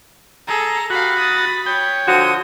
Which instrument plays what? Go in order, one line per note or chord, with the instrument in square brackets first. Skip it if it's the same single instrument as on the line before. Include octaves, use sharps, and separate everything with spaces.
[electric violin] G#4 A4 [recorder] A#5
[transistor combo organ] F#4 [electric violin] G4 F5 [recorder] B5
[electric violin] D#6 A6
[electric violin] C#5 [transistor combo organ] G5
[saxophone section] D3 F3 F#4 [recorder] D#6